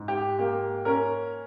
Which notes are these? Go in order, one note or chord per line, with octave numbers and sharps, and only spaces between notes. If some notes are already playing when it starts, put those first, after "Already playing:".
Already playing: G#2
G4
A#3 G4
C#4 A#4